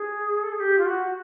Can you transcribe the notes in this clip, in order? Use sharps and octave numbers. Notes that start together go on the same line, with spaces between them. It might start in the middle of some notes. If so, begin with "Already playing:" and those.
Already playing: G#4
A4
G#4
G4
F4
F#4